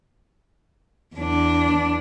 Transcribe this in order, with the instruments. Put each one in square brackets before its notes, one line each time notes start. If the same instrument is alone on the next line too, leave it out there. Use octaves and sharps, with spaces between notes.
[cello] E2 D4